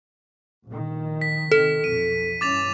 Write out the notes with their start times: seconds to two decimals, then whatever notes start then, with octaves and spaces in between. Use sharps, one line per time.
0.66 A#1 D#3
1.21 B6
1.52 C3 D#3 A4 B6
1.84 B1 F2 D#7
2.41 G2 E3 C#4 D6 A6 F7